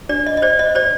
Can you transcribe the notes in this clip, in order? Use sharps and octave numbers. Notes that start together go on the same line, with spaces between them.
D4 D5
D#5
D#5
C5 D5
D#5
C5 D5